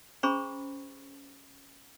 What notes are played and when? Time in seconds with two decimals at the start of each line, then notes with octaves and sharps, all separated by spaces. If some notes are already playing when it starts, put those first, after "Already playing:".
0.23 C#4 G#4 C5 A#5 B5 C#6